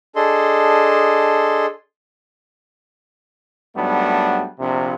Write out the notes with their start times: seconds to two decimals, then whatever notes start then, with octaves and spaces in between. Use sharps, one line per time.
0.16 D4 G#4 A4 D#5 C6
3.76 G#2 F#3 G3 A3 B3 D4
4.59 A#1 C3